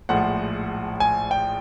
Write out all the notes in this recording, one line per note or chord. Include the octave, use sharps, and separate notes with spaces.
A#1 A2 F3 G#3 F#5
G#5
G5